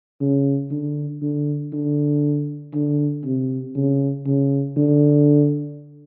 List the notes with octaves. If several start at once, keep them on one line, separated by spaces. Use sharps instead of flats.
C#3
D3
D3
D3
D3
C3
C#3
C#3
D3